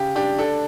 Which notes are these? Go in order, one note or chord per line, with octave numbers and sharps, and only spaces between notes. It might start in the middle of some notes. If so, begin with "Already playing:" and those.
Already playing: C#3 G4
D4 G4
D4 A4